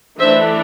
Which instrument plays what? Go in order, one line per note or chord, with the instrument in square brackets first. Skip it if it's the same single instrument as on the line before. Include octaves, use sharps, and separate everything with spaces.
[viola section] E3 A3 D4 C5 E5